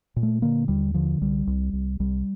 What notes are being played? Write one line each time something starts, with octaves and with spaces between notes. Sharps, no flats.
A#2
A3
D3 A#3
D#2 G3
D3 F3
C2 G3
C2
C2
C2 G3